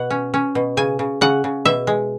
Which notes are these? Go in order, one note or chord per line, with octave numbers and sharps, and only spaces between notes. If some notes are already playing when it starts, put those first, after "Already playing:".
Already playing: B2 F#5
C#4
C#4
B2
C#3 G#5
C#3
C#3 F#5
C#3
B2 E5
G#3